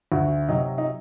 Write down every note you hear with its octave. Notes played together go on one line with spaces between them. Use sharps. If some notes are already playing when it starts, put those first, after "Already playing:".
D2 F#4
C3 F#3 D#4
D#4